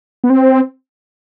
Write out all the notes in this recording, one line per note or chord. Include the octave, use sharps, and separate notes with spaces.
B3
C4